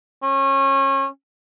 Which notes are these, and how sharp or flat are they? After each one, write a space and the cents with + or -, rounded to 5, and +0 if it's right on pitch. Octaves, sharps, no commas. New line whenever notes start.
C#4 -30